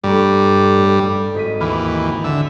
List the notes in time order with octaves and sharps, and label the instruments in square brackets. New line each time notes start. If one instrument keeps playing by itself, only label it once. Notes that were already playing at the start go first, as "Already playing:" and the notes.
[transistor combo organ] G2 G3 [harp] A3 A#5 C#6
[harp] A2
G#1 B6 D#7
[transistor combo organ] D#2 E3 [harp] B5 D6 F6
[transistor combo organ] D3 E5